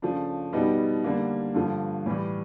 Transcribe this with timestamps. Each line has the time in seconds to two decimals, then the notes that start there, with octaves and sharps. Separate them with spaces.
0.02 C#3 F3 A3 D4
0.53 B2 G3 B3 D#4 G4
1.04 D3 G3 A#3
1.54 G2 D3 F3 A3
2.06 A2 E3 G3